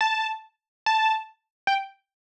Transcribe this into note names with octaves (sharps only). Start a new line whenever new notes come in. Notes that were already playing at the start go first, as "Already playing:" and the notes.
A5
A5
G5